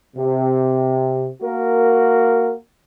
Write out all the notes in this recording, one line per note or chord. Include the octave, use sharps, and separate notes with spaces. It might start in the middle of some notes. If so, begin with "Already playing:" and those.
C3
A#3 F#4 A#4